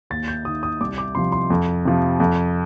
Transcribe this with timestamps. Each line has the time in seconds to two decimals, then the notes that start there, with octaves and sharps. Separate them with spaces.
0.10 D#2 A6
0.28 G6
0.45 D#3 D#6
0.63 D#6
0.80 C2 D6
0.98 D6
1.15 C3 F3 C6
1.32 C6
1.50 F2
1.85 C3 F3
2.20 F2